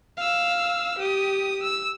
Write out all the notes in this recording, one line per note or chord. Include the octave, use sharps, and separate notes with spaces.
F5 E6
G4 D#6
E6